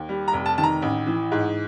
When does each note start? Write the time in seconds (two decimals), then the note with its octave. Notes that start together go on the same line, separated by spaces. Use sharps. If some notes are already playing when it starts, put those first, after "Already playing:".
Already playing: D#2
0.09 G3
0.28 A#5
0.33 F1
0.46 A5
0.57 D#3 A5
0.63 A#5
0.82 A1
1.06 E3
1.32 G#2